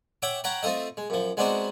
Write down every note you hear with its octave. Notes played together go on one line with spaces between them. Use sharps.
C#5 E5 F#5 G5 D6
C#5 F#5 G5 A#5 B5
A3 C4 F4 A4 D#5
G#3
F#2 F3
G#3 B3 C4 D4 D#4 F#4